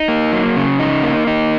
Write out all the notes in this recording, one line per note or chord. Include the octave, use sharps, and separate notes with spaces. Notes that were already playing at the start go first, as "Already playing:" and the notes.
Already playing: D#4
A#3
F#3
C#3
D#4
A#3
D#4